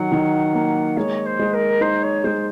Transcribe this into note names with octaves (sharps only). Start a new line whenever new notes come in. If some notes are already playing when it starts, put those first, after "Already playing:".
Already playing: D#3 F#3 F#5
D#3
A#3
G#3 C#5
C5
G#3
A#4
D#4 C5
C#5
G#3 C5